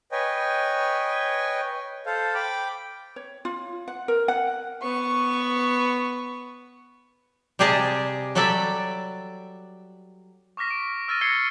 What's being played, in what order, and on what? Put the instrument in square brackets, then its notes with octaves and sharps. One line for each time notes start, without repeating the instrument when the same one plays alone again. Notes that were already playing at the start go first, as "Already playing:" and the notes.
[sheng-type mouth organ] B4 C#5 D#5 G5 G#5
A4 C5 F5
G5 B5 D6
[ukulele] C#5
F4
F#5
A#4
F#5
[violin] B3 C#6
[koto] C3 G3 G4 G#4 D#5 A5
F#3 G3 A4 D5 E5
[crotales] C#6 D6 F6 A#6 B6
D7
E6 F6 A6 A#6 D#7
E6 G#6 A#6 C7 C#7 G7